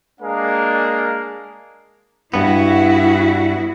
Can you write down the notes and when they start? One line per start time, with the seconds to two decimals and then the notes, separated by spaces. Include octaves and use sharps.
0.21 G#3 A#3 D4 G#4 A#4 F5
2.34 G2 B3 E4 F#4